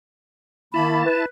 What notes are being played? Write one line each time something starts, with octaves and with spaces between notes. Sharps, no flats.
D#3 A#3 E4 A5 B5
B4